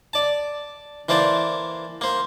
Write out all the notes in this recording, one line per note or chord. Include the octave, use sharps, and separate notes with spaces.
D5 A5
E3 A#3 C5 D5 A5
A#3 C5